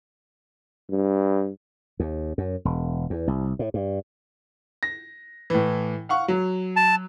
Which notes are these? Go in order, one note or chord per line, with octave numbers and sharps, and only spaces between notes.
G2
D#2
F#2
E1
E2
C2
A2
G2
A#6
A2 E3
F5 F#5 C#6
F#3
A5